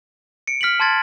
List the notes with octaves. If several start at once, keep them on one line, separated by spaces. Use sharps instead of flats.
C#7 D7
F6 B6 C#7 F#7
A5 C6 G#6 A6